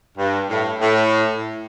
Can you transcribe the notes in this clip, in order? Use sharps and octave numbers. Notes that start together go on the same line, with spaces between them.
G2
A2
A2